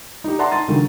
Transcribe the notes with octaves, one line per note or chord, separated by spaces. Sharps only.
D#4 G4
D5 E5 F#5 A5 A#5 C6
D#4 C6 A6 D#7
C#2 D3 D#3 F#3